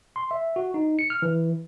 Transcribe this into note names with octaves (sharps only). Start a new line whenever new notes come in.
C6
E5
F#4
D#4
C#7
F6
E3